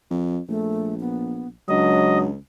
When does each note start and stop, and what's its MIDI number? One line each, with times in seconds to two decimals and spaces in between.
0.10 0.39 41
0.48 1.56 34
0.48 0.95 57
1.00 1.48 59
1.69 2.37 37
1.69 2.26 54
1.69 2.31 62
1.69 2.18 75